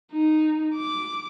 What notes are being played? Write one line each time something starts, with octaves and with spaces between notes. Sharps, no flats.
D#4
D6